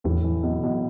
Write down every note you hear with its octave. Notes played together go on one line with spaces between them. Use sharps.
E2 A2
E3
B1
B1